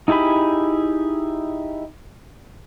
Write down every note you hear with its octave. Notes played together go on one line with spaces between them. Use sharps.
D#4 E4 G4 G#4 B5